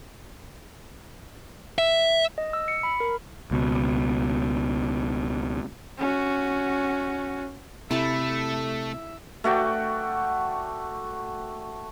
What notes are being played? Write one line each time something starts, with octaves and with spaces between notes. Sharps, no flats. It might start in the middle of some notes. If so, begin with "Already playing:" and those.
E5
D#5
E6
C#7
B5
A#4
C#2 B2
C#4 F#4
C3 A3 E4 A4 E5 A5
A3 F#4 D5 G5